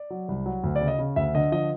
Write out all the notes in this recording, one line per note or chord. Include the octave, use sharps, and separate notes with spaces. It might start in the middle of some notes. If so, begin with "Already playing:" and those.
Already playing: D5
F#3
C2
F#3
D2
D5
C#3
D#5
C#3
D2 E5
D3 D#5
F3 D#5